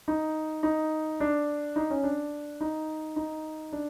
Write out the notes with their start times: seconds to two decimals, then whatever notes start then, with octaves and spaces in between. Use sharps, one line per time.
0.08 D#4
0.63 D#4
1.20 D4
1.76 D#4
1.90 C#4
2.03 D4
2.61 D#4
3.16 D#4
3.73 D4